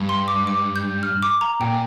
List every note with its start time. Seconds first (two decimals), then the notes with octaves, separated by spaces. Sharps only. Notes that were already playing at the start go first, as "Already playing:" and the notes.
Already playing: G2
0.09 C6
0.28 D6
0.47 D6
0.76 G6
1.03 F6
1.23 D6
1.41 A#5
1.60 A#2 G5